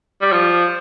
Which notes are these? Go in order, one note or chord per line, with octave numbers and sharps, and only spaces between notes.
G3
F3